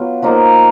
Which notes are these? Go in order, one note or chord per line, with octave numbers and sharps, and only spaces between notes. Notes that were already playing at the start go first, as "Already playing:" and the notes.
Already playing: F#3 B3 F4
F3 A#3 D#4